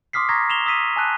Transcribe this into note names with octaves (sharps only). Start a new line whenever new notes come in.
C6 D6 D#6 F6 B6 C7
A#5 C#6 D#6 G#6 A#6 B6
C7 E7 F7 G7
D#6 E6 B6 D#7
G#5 A5 F#6 D#7